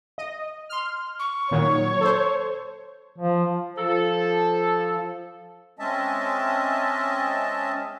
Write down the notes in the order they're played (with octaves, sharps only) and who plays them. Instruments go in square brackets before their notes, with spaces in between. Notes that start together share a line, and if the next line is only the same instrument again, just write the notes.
[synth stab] D#5
C6 F6
[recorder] C#6
[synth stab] A#2 D#3 F#3 [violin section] C#5
[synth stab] A4 C5
[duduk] F3
[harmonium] F3 [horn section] A4
[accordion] G#3 C4 C#4 D#5 E5 A5